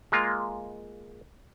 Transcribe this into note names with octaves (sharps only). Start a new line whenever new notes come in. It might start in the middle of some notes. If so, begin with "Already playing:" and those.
G#3 A#3 F4